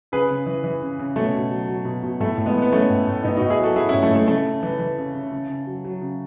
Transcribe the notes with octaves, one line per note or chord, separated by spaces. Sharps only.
C#3 G#4 B4
C#3
E3
E3
C#3
C#3
B2 A3 C#4
B2
F#3
F#3
B2
B2
A2 A3
A2
G#3 B3
E3
B3
E3 A3 C#4
A2
A2
A2 B3 D#4
D#4 F#4
A2
E4 G#4
F#3 F#4 A4
F#3 E4 G#4
C#4 E4
A2
A3 C#4
A2
A3
C#3 A3
C#3
E3
E3
C#3
C#3
C#3
C#3
F#3
F#3
C#3